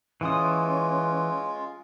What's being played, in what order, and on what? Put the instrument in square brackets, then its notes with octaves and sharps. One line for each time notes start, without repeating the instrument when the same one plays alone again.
[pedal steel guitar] E3 D#6 [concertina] G#3 F4 [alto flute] C#4